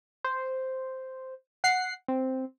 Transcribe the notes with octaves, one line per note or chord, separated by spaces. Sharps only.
C5
F#5 C7
C4